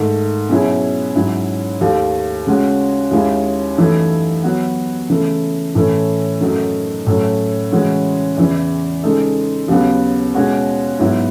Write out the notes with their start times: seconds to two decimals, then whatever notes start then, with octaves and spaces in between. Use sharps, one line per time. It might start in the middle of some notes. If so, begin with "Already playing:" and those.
Already playing: G#2 D#3 A3
0.49 B2 F#3 C#4 E4 G#4
1.15 G#2 F#3 C#4 E4
1.81 D#2 D#3 A3
2.47 C#3 G#3 C#4 F#4
3.11 D#2 D#3 G#3 C#4 E4
3.78 F#2 E3 A3 D#4
4.43 F#3 B3 F#4
5.10 C#3 E3 A3
5.75 A2 E3 A3 C#4
6.41 F#2 D#3 F#3 A3 D#4
7.06 A2 F#3 A3 C#4
7.72 C#3 E3 G#3 C#4 F#4
8.37 E2 C#3 E3
9.03 C#3 G#3 D#4 A4
9.68 D#2 C#3 F#3 B3
10.34 B2 G#3 C#4 F#4 C#5
10.99 G#2 F#3 B3 E4